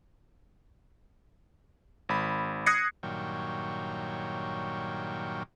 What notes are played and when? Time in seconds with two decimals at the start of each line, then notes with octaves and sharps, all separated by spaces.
2.09 G#1 B5
2.66 D#6 F#6 G#6 A#6 C7 C#7
3.03 G2 A#2 D#3 F#3 C#5 G5